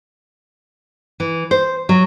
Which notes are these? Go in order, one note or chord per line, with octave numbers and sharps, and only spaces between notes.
E3
C5
F#3